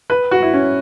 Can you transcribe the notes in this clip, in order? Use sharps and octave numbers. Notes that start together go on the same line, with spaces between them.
B4
F#4
E4
C#4